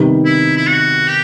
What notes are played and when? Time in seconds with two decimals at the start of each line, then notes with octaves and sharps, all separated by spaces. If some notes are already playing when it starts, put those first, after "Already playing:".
Already playing: C3 D#3 G3 B3 D#4
0.25 E4
0.57 E4
0.67 F#4
1.08 G4